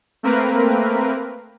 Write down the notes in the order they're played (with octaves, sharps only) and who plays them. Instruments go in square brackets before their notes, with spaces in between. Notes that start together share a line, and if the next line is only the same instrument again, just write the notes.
[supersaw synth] A3 A#3 C4 A#4 B4